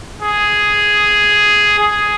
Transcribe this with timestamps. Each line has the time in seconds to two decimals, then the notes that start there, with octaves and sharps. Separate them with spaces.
0.22 G#4
1.80 G#4